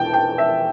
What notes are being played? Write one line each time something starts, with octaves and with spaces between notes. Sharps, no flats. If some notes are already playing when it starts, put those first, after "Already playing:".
Already playing: E1 E2 E3 G5 A5
G5
E5